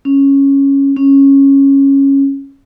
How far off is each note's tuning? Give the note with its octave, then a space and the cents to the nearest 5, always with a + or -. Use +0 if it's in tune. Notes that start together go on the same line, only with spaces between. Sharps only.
C#4 -5
C#4 -10